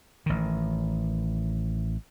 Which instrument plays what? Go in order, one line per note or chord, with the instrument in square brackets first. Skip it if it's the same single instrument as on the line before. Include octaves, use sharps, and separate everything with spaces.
[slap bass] A1 D#3